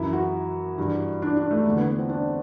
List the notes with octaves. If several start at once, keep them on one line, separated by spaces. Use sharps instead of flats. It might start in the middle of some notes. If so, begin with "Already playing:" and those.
Already playing: F#2 E3 E4
F#4
G2 E3
D4
D4
A3
E2 D3 A3
B3
C4
D4